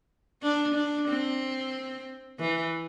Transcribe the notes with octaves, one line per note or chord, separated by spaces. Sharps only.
D4
D4
C4
E3